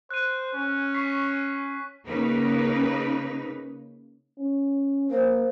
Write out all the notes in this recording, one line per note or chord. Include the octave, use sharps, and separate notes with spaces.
C5 F#6 D#7
C#4
C#6 B6 C7
C#3 A#3 D#4 B4
C#4
A#3 C5